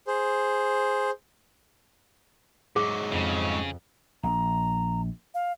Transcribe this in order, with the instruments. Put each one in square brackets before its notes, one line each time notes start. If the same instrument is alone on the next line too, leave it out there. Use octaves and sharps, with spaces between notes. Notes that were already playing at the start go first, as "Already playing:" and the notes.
[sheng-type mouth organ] G#4 C5
[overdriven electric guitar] G#2 F#3 [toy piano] G#4
[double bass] F2 [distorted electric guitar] C#3
[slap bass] A#1 [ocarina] A#5
[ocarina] F5